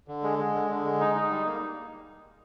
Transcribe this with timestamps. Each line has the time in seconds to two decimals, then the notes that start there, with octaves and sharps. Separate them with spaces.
0.08 D3
0.23 G#3
0.39 G#3
0.54 D3
0.70 D3
0.84 G#3
1.00 D#4
1.16 D#4
1.30 G3
1.46 A#3